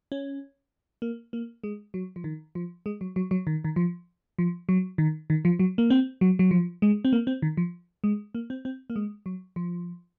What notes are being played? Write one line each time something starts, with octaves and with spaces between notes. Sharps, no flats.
C#4
A#3
A#3
G#3
F#3
F3
D#3
F3
G#3
F#3
F#3
F#3
D#3
D#3
F3
F3
F#3
D#3
D#3
F3
F#3
A#3
C4
F#3
F#3
F3
G#3
C4
A#3
C4
D#3
F3
G#3
A#3
C4
C4
A#3
G#3
F#3
F3